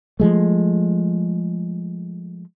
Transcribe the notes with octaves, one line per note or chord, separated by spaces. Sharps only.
F3 G#3 A3